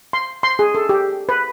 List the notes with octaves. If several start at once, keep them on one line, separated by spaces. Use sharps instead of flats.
C6
C6
G#4
A4
G4
B4